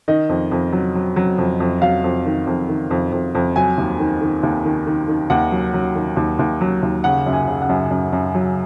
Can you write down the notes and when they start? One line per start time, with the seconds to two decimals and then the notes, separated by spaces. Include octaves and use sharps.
0.08 D#3 D#5
0.29 F2
0.51 F2
0.73 F#3
0.95 F#3
1.16 F#3
1.38 F2
1.60 F2
1.82 F#3 F5
2.04 F2
2.26 D#3
2.47 F2
2.69 D#3
2.91 F2
3.12 F2
3.35 F2
3.56 F#3 G#5
3.78 D#2
3.99 D#3
4.22 D#3
4.43 D#2
4.65 D#3
4.87 D#3
5.08 D#3
5.30 D#2 F#5
5.52 F#3
5.74 F#3
5.95 D#3
6.17 D#2
6.39 D#2
6.61 F#3
6.83 D#2
7.04 C#3 F#5
7.26 F#2
7.33 G#5
7.48 C#3
7.62 F#5
7.69 F#2
7.91 F#2
8.13 F#2
8.35 F#3